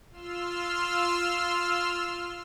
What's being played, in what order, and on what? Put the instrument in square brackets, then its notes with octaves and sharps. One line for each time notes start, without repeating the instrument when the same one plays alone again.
[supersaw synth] F4 C6 E6 F6